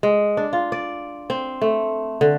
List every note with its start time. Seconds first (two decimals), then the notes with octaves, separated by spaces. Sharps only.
0.03 G#3
0.37 D4
0.53 F4
0.72 D5
1.30 C4
1.62 A3
2.21 D3